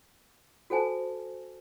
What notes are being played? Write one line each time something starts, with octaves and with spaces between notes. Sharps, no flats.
F#4 A4 C5 G#5 A5